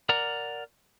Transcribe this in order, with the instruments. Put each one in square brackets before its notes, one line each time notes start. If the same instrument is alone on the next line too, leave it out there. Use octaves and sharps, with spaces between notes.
[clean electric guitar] A#4 D5 F#5 A#5